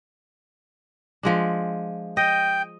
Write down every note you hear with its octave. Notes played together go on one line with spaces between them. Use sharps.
F3 G#3 D4
D#5 G5